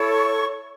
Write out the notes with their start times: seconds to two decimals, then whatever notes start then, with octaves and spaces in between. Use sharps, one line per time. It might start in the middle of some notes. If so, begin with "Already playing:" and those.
Already playing: E4 A4 C#5
0.10 C#6